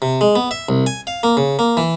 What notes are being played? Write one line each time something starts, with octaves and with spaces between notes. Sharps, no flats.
C3
G#3
B3
E5
C2
G#5
F5
A#3
C#3
A#3
E3